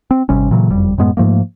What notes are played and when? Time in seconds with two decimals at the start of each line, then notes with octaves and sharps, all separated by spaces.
0.11 C4
0.29 G#1 C3 G3 C#4
0.51 A#2 C#3 E3 F#3
0.70 F#1 F2 G3
0.98 F#2 A2 G#3 B3
1.17 G#2 F3 A3 A#3